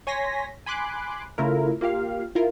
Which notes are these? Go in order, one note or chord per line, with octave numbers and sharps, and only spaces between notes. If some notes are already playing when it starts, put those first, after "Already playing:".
C#5 G#5 C6 A#6 B6
G#5 B5 C6 D6 F#6
C#3 A3 E4 F4 A#4
A#3 F4 G4 F5
E4 F4 A#4